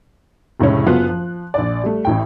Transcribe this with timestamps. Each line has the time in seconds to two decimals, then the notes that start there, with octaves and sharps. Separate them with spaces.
0.60 F1 A2 C#3 G#3 C#4
0.86 F#1 F#3 B3 F4 F#6
1.09 F3
1.54 A#1 D5
1.84 G3 A3
2.05 A1 A2 G5